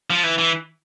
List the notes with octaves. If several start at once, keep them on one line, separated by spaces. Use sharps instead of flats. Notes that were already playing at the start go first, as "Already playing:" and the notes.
F3
E3
E3